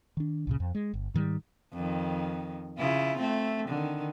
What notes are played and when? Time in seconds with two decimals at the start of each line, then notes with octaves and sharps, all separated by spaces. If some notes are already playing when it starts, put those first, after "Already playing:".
0.17 D#3 D4
0.47 C#2 A#2 C#3
0.60 F2
0.75 G#3
0.94 G1
1.14 G#2 D#3 F#3 G3
1.73 F2 D#3
2.78 C#3 E4 F4
3.18 A3 C4
3.69 D3 D#3